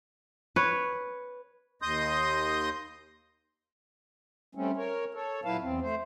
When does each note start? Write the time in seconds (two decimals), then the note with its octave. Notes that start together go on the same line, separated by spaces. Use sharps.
0.56 B4 C#5
1.82 D#2 D#5 C6 D#6 G6
4.55 G3 A3 C4 C#4
4.77 A#4 C#5
5.14 A4 C#5
5.45 A#2 F#3 E4 B4 F5 A5
5.61 E2 C4
5.81 A3 C5